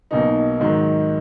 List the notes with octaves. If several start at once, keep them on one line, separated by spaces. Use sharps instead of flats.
B1 B2 A#3 D#4
G#2 D#3 F#3